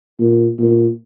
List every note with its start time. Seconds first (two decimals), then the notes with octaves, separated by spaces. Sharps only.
0.20 A#2
0.59 A#2